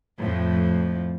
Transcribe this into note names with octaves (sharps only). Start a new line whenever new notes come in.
F2 A2 F3